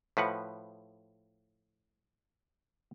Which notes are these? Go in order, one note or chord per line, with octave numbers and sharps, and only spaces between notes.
A2 F3 B4 F#5